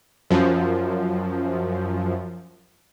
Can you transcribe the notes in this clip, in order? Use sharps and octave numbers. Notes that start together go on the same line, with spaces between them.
F#2 F3